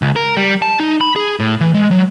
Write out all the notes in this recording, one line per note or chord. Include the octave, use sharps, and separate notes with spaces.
C#2
A#4
G3
A5
D#4
B5
G#4
A2
E3
G#3
F#3